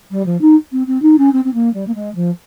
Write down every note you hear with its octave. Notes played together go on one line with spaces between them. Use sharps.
G3
F3
D#4
C4
C4
D#4
C#4
C4
C4
A#3
G3
A#3
G#3
F3